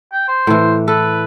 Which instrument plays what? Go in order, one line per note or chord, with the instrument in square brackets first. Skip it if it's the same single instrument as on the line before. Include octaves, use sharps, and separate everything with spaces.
[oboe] G5
C5
[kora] A2 E3
[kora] A4 [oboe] B4